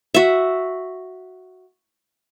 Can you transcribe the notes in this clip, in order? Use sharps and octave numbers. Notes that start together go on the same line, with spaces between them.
F#4 E5